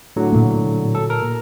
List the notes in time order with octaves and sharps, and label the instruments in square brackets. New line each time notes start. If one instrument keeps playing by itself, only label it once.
[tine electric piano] A2 D3 F#3
[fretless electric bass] A#2 A#3
[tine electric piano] A4
A#4